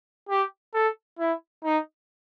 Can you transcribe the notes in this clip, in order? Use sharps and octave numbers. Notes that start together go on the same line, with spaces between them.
G4
A4
E4
D#4